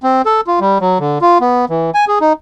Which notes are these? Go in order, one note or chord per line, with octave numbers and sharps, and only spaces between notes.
C4
A4
F4
G3
F#3
D3
F4
B3
E3
G#5
G#4
D#4